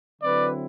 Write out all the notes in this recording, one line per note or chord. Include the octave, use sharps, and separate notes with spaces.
D3 F#3 C4 E4 B4 D5